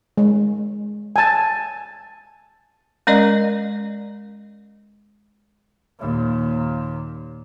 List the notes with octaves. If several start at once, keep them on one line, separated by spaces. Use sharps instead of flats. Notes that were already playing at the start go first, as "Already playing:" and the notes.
G#3
G#5 A5
G#3 C#4 A#4 D5 D#5
D#2 A#2